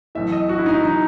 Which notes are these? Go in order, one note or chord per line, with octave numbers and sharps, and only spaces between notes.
B1 A2 E3 E5
D#5
F#4
E4
B1 A2 E3 D#4
D#4